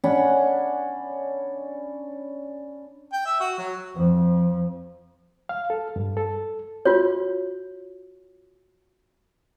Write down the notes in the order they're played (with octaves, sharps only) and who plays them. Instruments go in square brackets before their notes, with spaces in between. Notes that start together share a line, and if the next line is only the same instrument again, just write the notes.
[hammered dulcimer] C#4 D4 F#5 B5
[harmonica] G5
E5
F#4
F#3
[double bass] F2 F3
[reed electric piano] F5
A4
G2
A4
[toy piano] F4 F#4 C#5